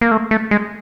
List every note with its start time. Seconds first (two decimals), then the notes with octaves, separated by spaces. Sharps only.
0.01 A#3
0.11 A3
0.31 A3
0.51 G#3